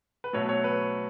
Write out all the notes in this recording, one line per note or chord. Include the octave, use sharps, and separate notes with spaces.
B4
B1 B2 F#3 A3 C#5
C#5
B4